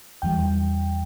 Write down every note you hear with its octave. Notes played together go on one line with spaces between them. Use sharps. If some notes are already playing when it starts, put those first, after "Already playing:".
E2 E3 G3 G5